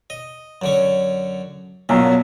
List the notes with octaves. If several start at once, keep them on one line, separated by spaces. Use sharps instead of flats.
D#5
F#2 D3 C#4
B1 F#2 A#2 F#3